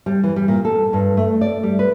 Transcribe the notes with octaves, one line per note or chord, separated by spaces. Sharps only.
G3
E3
G3
A#2
A4
G2
A3
D5
G3
B4